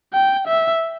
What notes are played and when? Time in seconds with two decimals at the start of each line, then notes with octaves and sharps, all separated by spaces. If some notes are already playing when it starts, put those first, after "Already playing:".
0.14 G5
0.48 E5